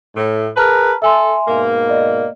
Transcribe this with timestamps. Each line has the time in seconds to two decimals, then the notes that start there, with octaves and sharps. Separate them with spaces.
0.15 A2
0.57 G#4 A#4 B4 A5 A#5 F6
1.02 A4 E5 G#5 C6
1.48 G#2 B2 A#3
1.89 D5 D#5